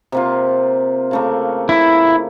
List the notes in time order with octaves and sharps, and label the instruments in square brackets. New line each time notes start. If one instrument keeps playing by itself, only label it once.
[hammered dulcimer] C3 A#3 F4
C#3 A3 A#3
[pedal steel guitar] E4